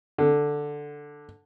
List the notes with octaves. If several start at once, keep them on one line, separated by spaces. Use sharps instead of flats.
D3